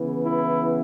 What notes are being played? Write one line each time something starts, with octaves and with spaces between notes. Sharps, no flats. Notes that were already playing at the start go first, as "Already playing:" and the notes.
Already playing: C#3 E3 B3
E4